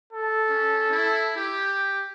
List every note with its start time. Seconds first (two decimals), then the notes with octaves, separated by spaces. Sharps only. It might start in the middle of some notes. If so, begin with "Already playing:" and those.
0.13 A4
0.49 C#4
0.91 E4
1.36 G4